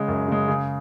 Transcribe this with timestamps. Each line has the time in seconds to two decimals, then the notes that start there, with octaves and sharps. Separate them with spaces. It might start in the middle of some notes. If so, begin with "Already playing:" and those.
Already playing: C#3 G#3
0.08 F#2
0.28 C#3 G#3
0.48 C#3